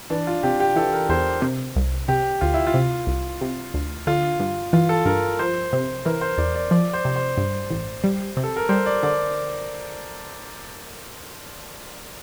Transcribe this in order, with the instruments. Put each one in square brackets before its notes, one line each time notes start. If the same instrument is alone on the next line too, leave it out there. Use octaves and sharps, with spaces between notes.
[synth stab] E3 [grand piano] D4
[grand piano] F4
[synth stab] C3 [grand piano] G4
[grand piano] G4
[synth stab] E3 [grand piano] A4
[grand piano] A#4
[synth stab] E2 [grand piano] C5
[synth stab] C3
C2
[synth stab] C3 [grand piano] G4
[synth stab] D2 [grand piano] F4
[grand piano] E4
F4
[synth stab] C3
C2
C3
D2
[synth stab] D3 [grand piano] F4
[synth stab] G2
[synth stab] E3 [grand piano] F4
[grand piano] A4
[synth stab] G2 [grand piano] A#4
[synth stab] F3 [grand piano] C5
[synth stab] C3
[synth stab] E3 [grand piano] A#4
[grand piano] C5
[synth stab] E2 [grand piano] D5
[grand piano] D5
[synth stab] F3 [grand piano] D5
[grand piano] C5
[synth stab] C3
[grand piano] C5
[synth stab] G2
A1
G3
C3
[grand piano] A4
A#4
[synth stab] G3 [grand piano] C5
[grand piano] D5
[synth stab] D3 [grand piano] D5